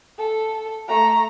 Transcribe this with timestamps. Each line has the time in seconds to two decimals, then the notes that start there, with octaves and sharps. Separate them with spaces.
0.18 A4
0.88 A3 A#5